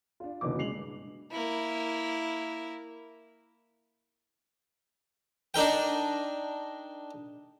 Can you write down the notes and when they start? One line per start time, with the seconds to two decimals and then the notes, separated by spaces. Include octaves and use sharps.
0.20 D4 F4
0.41 F#1 D2 B2 E3 D6
0.58 C#3 G#3 C7 F7 F#7
0.73 G2
1.31 A#3 E4
5.54 D4 D#4 A#4 G5